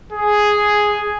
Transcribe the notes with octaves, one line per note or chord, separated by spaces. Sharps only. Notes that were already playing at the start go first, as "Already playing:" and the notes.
G#4